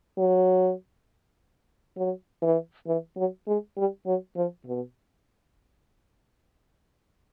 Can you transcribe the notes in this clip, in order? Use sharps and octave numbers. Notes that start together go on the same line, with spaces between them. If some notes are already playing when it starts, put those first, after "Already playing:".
F#3
F#3
E3
E3
F#3
G#3
G3
F#3
F3
B2